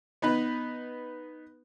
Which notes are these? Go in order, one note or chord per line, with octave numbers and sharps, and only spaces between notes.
B3 D#4 B4